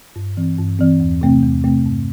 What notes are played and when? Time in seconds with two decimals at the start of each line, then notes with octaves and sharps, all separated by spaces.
0.16 G2
0.37 E3 C4
0.58 G2
0.79 E3 C4
1.00 E2
1.21 C3 A3 C4
1.42 E2
1.64 C3 A3 C4
1.85 G2